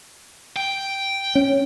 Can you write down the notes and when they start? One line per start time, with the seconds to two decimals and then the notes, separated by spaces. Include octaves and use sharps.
0.56 G5
1.35 C#4